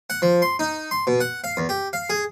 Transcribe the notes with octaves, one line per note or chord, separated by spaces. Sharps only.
F#5
F3
C6
D#4
C6
B2
F#5
F5
E2
G4
F5
G#4